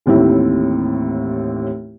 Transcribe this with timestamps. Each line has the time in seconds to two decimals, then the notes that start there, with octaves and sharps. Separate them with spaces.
0.06 A1 D#2 A2 C4 E4